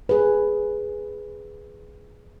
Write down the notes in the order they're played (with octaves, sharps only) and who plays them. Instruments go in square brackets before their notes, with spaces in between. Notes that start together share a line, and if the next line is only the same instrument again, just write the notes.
[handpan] G#4 B4